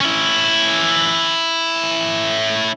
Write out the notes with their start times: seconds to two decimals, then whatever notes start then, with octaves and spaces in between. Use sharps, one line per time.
0.01 C#4 E4